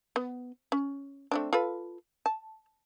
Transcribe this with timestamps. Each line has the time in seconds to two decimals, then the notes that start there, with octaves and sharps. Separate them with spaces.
0.16 B3
0.72 C#4
1.31 A3 C4 D4
1.53 F4 A4 B4
2.26 A5